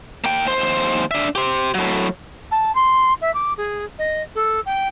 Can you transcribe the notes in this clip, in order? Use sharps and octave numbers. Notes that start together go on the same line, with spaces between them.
A#3 G5
D#2 C5
D4 E5
G4 C5
A2 F#3
A5
C6
E5
D6
G#4
D#5
A4
G5